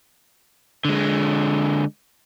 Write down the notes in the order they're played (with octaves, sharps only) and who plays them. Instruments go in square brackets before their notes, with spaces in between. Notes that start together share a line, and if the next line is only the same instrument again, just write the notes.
[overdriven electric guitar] D3 G#3